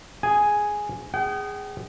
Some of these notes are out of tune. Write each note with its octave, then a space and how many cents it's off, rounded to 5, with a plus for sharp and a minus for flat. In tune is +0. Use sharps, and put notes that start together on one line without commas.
G#4 +0 G#5 +0
G#4 -15 G5 -45